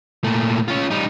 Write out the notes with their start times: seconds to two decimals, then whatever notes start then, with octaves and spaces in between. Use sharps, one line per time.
0.24 A#2 A3
0.68 C#4 F4
0.91 G3 D#4